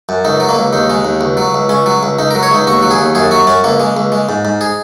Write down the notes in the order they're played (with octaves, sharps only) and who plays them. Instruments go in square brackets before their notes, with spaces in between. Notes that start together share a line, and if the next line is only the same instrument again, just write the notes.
[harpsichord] F#2
C#2 D#4
F#3
A#3
C#2
D#2 D#4
G#3
D#2
C#2
F#3
C#2
C#2 C#4
F#3
C#2
C#2 D#4
A#4
F#3
C#5
C#2 D#4
D#2 F#4
F#3
G#4
D#2
F#2 G#4
F#3 F#4
F#2 C#4
C#2 A#3
G#3
C#2
G#3
G#2
G#2
G#4